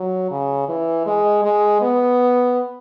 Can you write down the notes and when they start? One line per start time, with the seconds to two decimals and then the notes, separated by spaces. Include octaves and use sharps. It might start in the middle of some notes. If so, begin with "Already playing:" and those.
Already playing: F#3
0.31 C#3
0.69 E3
1.06 G#3
1.44 G#3
1.81 B3